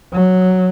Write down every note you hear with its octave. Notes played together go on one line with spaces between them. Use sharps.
F#3